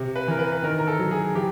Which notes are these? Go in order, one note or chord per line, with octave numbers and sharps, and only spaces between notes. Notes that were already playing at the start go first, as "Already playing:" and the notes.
Already playing: C3
B4
E3 A#4
B4
B4
D#3 A#4
A#4
A4
F#3
G#4
E3 G4